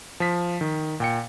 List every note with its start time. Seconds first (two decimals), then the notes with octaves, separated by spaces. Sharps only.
0.20 F3 B6
0.61 D#3
1.00 A#2 G5 C#7